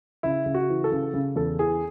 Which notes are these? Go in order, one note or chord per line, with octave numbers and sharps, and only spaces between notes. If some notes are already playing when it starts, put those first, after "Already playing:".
C#3 E4
C#3
F#4
E3
A4
C#3
C#3
E2 A4
E3 G#4